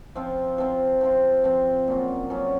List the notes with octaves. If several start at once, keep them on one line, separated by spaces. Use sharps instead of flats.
F3 C4 F4
F3 C4 F4
F3 C4 F4
F3 C4 F4
A#2 F#3 C#4 F4
A#2 F#3 C#4 F4